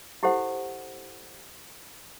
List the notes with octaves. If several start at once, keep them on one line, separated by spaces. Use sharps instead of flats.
E4 G4 A4 C5 F#5